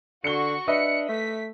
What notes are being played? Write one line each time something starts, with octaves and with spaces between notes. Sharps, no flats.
D3 F#4 C#6 C#7 G7
D4 B4 D#5 E5 C#7
A3 B6